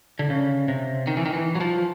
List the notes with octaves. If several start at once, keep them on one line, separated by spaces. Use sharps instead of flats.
D3
C#3
C3
D#3
E3
D#3
E3
F#3
F3